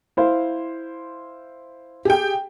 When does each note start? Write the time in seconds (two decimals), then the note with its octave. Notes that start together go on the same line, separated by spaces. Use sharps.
0.17 E4 C5 F5
2.05 G4 G#4 G5